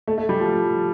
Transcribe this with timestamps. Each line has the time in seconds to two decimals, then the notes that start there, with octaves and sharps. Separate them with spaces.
0.07 A3
0.18 A3
0.29 G3
0.40 F3